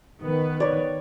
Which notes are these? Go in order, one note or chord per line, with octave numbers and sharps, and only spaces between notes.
D#3 B3 B4
C#5 D5